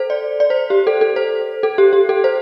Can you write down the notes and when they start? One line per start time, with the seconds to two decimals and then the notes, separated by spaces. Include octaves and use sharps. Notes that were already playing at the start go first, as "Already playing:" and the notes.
Already playing: A4 C5
0.10 D5
0.40 D5
0.50 C5
0.70 G4
0.87 A4
1.01 A4
1.16 C5
1.63 A4
1.78 G4
1.93 G4
2.09 A4
2.24 C5